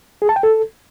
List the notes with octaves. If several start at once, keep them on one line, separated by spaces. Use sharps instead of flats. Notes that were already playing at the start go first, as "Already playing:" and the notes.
G#4
A5
G5
A4